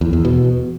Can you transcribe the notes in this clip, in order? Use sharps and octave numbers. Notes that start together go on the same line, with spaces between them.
E2
E2
B2